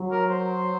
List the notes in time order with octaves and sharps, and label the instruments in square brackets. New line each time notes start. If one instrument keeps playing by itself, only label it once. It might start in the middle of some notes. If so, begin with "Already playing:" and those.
Already playing: [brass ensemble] F#3
[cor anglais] A#4
C5